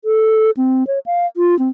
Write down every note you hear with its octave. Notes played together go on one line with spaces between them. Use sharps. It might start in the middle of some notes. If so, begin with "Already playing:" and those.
A4
C4
C#5
F5
F4
C4